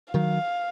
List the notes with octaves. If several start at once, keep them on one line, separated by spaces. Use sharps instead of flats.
D#3 F#3 F5